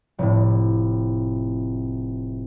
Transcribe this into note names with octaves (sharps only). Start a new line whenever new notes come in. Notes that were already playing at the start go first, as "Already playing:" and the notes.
F1 A2